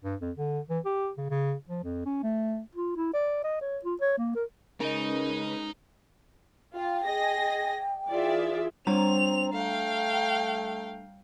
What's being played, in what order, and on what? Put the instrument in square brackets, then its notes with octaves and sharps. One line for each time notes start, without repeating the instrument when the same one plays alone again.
[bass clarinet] G2
F2
D3
E3
G4
C#3
C#3
F3
F2
C#4
A3
[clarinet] F4
E4
D5
D#5
C#5
F4
C#5
A#3
A#4
[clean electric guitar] C#3 [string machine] G#3 C#4 B4 [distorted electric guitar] D#4 [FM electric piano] A#4 D#5
[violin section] F4 [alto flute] G5
[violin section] G#4 D#5 A#6
[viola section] E3 F4 G#4 [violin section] D5 E5
[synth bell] G3 A#5 [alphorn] C4 [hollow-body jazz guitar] D4 C5 C#5 [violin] F7
[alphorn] A3 [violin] F5 G5